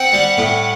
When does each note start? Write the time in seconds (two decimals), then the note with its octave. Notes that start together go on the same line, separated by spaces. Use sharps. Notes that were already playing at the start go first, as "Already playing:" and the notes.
Already playing: C4 F#5
0.13 G3
0.38 A2